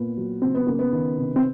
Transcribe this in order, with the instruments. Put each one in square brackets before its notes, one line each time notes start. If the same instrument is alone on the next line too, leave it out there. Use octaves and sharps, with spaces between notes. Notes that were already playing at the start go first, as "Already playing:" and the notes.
Already playing: [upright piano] A#2 B3
F#3
C#3 C4
B3
C#3 A#3
B3
D#3
C3
C4